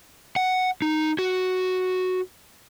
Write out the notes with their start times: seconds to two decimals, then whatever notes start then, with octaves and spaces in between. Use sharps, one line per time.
0.36 F#5
0.82 D#4
1.19 F#4